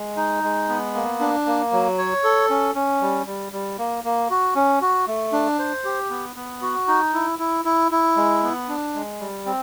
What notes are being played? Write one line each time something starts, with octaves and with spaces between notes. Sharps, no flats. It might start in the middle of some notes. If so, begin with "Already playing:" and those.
Already playing: G#3
D#4
G#3
B3
A#3
D4
A#3
F#3
C#5
A4
C#4
C#4
G3
G3
G3
A#3
A#3
F#4
C#4
F#4
A3
D4
C5
G4
B3
B3
F#4
D#4
E4
E4
E4
E4
G#3
B3
D4
G#3
G3
C4